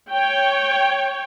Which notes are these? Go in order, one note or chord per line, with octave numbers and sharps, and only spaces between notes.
C#5 G5